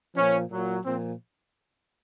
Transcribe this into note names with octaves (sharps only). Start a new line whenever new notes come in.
A#2 F3 C#4
A#2 F#3
A#2 F3 C4